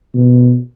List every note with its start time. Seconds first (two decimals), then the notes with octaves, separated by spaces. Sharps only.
0.14 B2